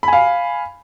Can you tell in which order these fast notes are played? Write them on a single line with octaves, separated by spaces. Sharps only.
B5 G#5 F5